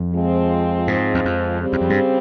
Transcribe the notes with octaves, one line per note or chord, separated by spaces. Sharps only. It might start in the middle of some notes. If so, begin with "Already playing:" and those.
Already playing: F2
F3 G#3 C4
G#2
E2
F2
C#3 G3 C4
E2
F2
G2